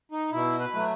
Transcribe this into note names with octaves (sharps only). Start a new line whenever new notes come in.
D#4
B2 E4
B4
F#3 A3